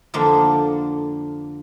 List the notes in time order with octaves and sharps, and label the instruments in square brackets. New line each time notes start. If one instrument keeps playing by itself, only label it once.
[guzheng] F2 D3 A#3 G5